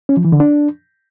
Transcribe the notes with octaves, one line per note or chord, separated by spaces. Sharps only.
C#4
F3
E3
D3
D4